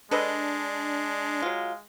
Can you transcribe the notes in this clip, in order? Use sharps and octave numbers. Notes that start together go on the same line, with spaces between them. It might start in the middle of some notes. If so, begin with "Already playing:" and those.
G#3 D4 A4 B4 D#5
F#3 F4